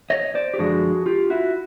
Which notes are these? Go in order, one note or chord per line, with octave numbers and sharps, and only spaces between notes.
C#5 D#5
C5 D5
G4
F#2 D3 F3 G#3 F#4 G#4
F4 G4
E4 F#4